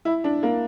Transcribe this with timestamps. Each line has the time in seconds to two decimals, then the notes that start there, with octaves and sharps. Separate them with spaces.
0.05 E4
0.24 D4
0.43 A#3